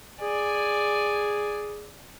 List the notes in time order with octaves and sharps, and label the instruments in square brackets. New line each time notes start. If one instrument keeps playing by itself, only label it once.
[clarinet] G#4 [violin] D5 G#5